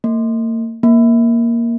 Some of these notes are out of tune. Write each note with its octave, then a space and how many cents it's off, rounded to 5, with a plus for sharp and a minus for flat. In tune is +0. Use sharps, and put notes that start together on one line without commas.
A#3 -40
A#3 +5